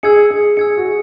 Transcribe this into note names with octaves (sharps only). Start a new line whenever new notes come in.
G#4 E6 G#6 C#7
G#4
G#4 E6 G#6 C#7
F#4
G#4